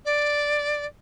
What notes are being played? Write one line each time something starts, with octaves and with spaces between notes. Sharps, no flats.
D5